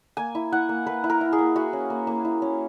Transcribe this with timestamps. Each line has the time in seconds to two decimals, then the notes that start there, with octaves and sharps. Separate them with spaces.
0.17 A#3 G#5
0.35 E4
0.52 E4 F#5
0.69 A#3
0.86 A#3 B4
1.04 E4
1.10 A#4
1.21 E4
1.32 G#4
1.38 A#3
1.55 E4 F#4
1.73 C#4
1.90 A#3
2.07 A#3
2.25 E4
2.42 C#4